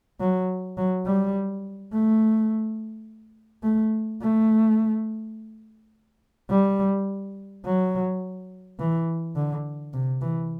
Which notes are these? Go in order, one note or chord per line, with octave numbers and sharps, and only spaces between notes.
F#3
F#3
G3
A3
A3
A3
G3
F#3
E3
D3
C3
E3